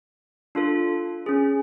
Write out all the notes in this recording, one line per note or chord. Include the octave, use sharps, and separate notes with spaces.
D4 F4 A4
C#4 G#4